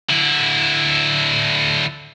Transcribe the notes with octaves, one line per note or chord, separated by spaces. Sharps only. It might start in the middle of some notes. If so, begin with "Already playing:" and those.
D3 E4